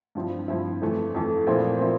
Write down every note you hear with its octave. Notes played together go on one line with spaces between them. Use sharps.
G2 F3 C4 E4
G2 F3 C4 E4
F2 E3 A3
F2 E3 A3
A#2 F3 C4 E4
A#2 F3 C4 E4